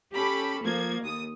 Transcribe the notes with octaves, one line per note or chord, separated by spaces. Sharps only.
C#4 G4 A4 B5
F3 A#3 G#6
D#2 D#6